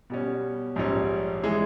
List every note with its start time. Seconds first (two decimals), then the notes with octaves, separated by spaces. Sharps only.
0.10 B2 G3 C#4
0.76 A#1 G#2 G3 C#4
1.43 E3 G#3